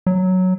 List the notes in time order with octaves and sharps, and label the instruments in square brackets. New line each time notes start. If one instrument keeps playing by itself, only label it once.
[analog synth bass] F#3